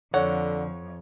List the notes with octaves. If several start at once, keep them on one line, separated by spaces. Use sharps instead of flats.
F2 D3 C#5 F#5